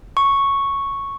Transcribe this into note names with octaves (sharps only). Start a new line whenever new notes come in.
C#6